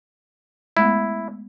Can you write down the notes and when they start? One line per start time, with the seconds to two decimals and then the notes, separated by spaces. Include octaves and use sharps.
0.77 G#3 A3 B3 E4